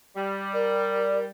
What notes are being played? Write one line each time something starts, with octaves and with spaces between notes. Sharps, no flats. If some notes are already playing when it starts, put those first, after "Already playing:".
G3
A#4 D5